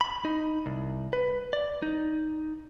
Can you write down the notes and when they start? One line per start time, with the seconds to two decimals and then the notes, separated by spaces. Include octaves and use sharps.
0.01 B5
0.25 D#4
0.66 C2
1.13 B4
1.53 D5
1.82 D#4